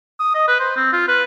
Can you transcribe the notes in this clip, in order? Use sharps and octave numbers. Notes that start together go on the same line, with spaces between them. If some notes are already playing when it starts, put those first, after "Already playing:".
D#6
D#5
B4
C5
C4
F4
B4